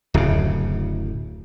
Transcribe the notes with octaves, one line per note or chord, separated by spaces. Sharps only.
D1 F#2 C#3